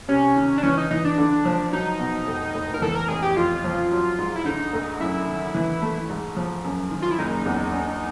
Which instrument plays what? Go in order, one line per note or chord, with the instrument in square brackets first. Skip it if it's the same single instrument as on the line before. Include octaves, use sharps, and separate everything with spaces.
[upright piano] C3 [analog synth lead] C#4
[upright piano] D#3
[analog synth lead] D4
[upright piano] E3 [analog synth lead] C#4
[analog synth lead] D#4
[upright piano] E3 [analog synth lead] D#4
[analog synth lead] D4
[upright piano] D3
F3
[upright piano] F#3 [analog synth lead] D#4
[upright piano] B2
F1
F1
[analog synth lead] A#4
[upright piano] E3 [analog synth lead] A4
[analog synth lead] A#4
[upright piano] A1 [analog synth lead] G#4
[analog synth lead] G4
[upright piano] F2 [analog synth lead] F4
[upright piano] F3
F#3
G#2
[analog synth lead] E4
[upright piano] D3 [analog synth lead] D#4
[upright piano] D2
[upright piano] F#2 [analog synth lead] E4
[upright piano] D#3
E3
A3
G#2
F3
F#2
D#3
[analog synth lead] F4
E4
[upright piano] F#1 [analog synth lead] D#4
[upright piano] E2
D4